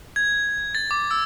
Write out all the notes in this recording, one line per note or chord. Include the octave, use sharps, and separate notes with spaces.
G#6
A6
D6
E6